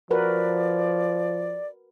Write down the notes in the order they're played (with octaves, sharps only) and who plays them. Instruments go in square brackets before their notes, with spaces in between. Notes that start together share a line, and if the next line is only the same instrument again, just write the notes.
[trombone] F3 [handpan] F#4 A#4 B4 [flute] D5